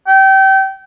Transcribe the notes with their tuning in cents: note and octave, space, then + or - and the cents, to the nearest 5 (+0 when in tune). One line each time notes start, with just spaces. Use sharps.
G5 -25